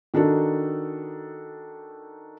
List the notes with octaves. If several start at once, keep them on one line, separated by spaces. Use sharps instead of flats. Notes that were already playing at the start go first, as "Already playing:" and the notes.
D#3 D4 D#4 F#4 A4